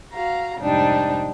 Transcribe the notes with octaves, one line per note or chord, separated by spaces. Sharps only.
F#4 F5 A#5
F2 G#2 C3 G3 D4 D#4